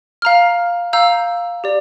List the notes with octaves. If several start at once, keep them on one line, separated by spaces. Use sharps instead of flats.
F5 A#5 F6
F5 A#5 E6 G6
G4 D5